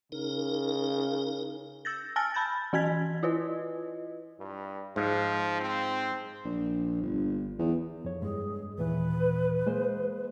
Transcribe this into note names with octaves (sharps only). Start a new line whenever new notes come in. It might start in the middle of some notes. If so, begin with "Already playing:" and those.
C#3 D#4 A#4
E6 G6 A6 A#6
G#5 A5 E6 F6 A6 A#6
A5 B5 G6 A6
E3 F#4 G#5 G#6 B6
E4 F4 B4 D#5
G2
G#2 F3
C4
A#1
G1
E2
F2 C#5
G2 G#3 G#4
D#2 A#2 E3 B4
G#3 A#3 C5